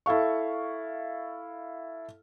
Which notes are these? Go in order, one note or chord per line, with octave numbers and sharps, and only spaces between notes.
E4 A4 F5 C#6